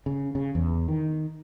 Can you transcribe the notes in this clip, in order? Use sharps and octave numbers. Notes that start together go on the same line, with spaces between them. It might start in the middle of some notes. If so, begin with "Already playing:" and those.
C#3
C#3
E2
D#3